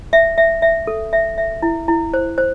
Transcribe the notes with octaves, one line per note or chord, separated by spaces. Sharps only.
E5
E5
E5
A4
E5
E5
E4
E4
C5
C5